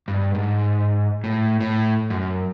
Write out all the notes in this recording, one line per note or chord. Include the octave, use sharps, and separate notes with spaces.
G2
G#2
A2
A2
F#2